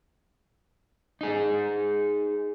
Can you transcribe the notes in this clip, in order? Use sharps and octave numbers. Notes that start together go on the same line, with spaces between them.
D#4 G#4